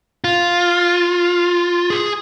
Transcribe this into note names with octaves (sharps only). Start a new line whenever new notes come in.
F4
G#4